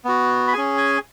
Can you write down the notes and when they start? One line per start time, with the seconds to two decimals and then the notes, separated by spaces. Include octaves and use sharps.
0.05 B3 F#4
0.48 B5
0.53 C#4 G#4 G#5
0.77 G#5